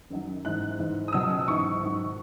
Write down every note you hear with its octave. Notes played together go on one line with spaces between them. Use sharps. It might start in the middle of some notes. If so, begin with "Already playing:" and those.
F#2 D#3 F#3
G#2 E3 F#6
G#2 E3
D#6
C#2 B2 F#3 E6
G#2 E3 C#6
G#2 D#3 F#3